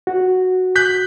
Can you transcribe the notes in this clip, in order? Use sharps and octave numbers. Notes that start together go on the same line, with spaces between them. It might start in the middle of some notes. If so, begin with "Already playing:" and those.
F#4
F#6 G6 B6